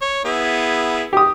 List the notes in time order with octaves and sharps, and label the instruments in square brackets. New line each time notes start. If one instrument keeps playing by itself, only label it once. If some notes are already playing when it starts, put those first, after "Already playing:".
[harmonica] C#5
B3 E4 G#4
[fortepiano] G4 D#6